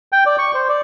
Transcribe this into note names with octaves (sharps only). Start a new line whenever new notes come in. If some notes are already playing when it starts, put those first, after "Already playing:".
G5
D5
C#6
C5
D5